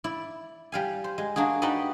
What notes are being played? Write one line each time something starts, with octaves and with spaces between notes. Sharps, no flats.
E4 D5
G3 F5 G#5
C5
G#3
A#3 D4 F#4 G#4
D#4 F#4 G4 B4 D5 D#5